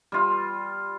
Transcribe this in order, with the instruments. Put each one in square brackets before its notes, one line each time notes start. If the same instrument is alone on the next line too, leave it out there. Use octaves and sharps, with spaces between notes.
[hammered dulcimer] G3 F4